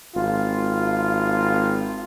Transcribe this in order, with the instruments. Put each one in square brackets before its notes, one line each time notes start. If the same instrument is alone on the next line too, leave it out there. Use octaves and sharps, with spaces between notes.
[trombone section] G#1 F4